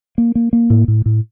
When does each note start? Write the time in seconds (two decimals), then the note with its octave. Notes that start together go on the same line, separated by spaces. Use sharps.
0.18 A#3
0.35 A#3
0.53 A#3
0.70 A2
0.88 A2
1.06 A2